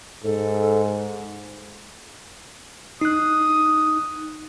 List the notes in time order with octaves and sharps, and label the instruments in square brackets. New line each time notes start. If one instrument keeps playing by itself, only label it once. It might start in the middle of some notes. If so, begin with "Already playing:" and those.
[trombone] G#2 [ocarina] A4
[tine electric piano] D#4 F#6 [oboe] D#6